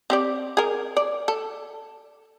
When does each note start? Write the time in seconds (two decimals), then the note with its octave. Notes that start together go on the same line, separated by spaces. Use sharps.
0.10 C4 G4 D5
0.57 G#4 A#4
0.97 D5
1.28 A4